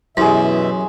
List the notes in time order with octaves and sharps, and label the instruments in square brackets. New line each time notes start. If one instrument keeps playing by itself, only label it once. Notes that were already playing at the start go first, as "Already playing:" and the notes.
[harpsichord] F#2 [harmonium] B2 E3 E5 [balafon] E4 G4 [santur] G#4 C5